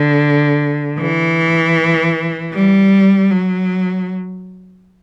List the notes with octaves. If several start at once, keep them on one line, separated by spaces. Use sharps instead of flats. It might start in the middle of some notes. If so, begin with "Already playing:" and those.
Already playing: D3
E3
G3
F#3